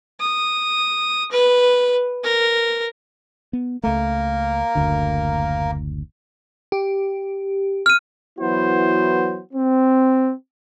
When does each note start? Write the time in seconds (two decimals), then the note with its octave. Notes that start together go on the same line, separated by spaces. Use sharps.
0.20 D#6
1.31 B4
2.24 A#4
3.53 B3
3.83 C#2 A3 A#3 A#4
4.75 F#1 D2 D3
6.72 G4
7.86 F6 D#7
8.38 E3 F#3 B3 E4 F#4 C5
9.53 C4